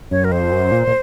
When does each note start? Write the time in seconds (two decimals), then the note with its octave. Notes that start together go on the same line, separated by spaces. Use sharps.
0.11 F#2 C#5
0.24 A#4
0.31 F2 C5
0.52 F#2
0.72 A#2
0.87 A#2